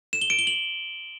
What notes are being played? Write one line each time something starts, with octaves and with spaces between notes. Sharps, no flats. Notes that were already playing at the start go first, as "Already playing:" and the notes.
E7
G7
D7
G7
F#7